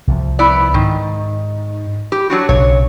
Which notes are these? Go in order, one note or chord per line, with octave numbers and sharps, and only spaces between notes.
C2 F3
B3 E4 D5
G#2 D#3
G4
F#3 D4 F#4
B1 C#3 C#5